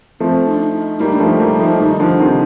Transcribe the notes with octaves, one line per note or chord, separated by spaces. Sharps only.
F3 A3 C4
D#4
D4
D#4
D#4
G3 A#3 D#4
G3 D4
F3 A3 D#4
G3 A#3
F3 A3
D#3 G3
D3 F3
C3 D#3